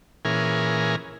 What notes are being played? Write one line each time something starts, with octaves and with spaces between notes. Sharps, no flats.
A#2 E3 C#4 G#4 A#4